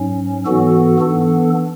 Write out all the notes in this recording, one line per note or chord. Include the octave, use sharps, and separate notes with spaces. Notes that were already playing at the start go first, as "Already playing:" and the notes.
Already playing: G#2 F#3 C#4
G#2 E3 B3 F#4 A4
E3 B3 D4 A4